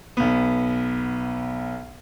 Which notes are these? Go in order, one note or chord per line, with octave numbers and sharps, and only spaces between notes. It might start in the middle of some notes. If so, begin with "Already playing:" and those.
B1 B3